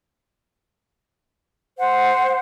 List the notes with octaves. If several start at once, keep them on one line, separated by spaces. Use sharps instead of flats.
C5 F#5